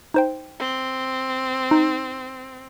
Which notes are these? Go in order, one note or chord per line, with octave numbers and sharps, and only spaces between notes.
D#4 C5 G5
C4
D#4